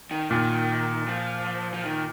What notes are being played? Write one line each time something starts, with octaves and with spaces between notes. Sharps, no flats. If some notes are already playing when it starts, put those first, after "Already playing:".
D#3
A#2 D#3
F3
F3
D#3